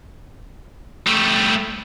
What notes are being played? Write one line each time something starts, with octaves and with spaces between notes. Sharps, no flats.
G3 A3